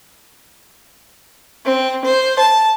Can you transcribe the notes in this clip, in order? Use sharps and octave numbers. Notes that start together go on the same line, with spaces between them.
C4
C5
A5